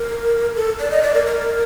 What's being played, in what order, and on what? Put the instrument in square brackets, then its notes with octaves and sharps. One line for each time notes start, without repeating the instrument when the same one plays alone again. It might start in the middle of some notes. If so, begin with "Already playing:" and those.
Already playing: [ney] A#4
A4
D5
D#5
D5
A#4
A#4